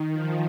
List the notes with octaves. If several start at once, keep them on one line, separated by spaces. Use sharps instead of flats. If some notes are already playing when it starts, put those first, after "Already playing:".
Already playing: D#3
F3